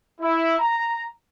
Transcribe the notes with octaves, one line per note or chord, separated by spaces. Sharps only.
E4
A#5